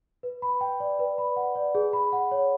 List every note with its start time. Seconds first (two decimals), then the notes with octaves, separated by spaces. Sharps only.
0.23 B4
0.42 B5
0.61 G5
0.80 D5
0.99 B4
1.18 B5
1.36 F#5
1.55 D5
1.75 G#4
1.93 B5
2.13 F#5
2.31 C#5